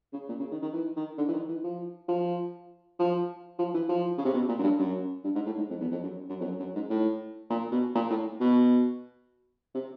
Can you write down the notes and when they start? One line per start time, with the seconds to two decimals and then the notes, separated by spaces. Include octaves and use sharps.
0.13 C#3
0.29 A#2
0.40 C#3
0.51 D#3
0.62 D#3
0.73 E3
0.96 D#3
1.18 D3
1.28 E3
1.33 D#3
1.48 E3
1.64 F3
2.08 F3
2.99 F3
3.59 F3
3.74 E3
3.89 F3
4.17 C#3
4.25 C3
4.34 B2
4.48 A#2
4.59 F#2
4.63 G2
4.79 F#2
5.24 G2
5.35 G#2
5.46 A2
5.58 G#2
5.70 F2
5.81 E2
5.91 F2
6.03 F#2
6.29 F#2
6.41 F2
6.44 F#2
6.60 F#2
6.75 G#2
6.89 A2
7.50 A#2
7.71 B2
7.95 A#2
8.10 A2
8.40 B2
9.75 C3